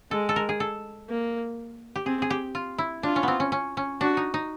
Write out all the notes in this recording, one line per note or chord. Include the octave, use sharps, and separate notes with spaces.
G#3 A4
A4
A#4
G#4
A4
A#3
G4
C4 G#4
G#4
G4
F4
E4
D4 F4
C#4
B3 C4
C#4
C#4
C#4
D4 F#4
D#4
D#4